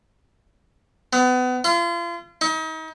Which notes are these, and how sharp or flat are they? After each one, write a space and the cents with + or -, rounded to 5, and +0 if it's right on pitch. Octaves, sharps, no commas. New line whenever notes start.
B3 +30
F4 -35
D#4 +40